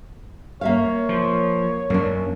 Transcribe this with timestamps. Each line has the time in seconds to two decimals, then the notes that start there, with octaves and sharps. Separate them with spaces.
0.61 A#3 C#5 E5 F5
1.09 F3
1.90 F#2 A#3 D4